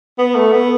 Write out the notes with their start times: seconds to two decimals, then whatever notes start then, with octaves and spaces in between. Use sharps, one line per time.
0.18 B3
0.35 A3
0.52 B3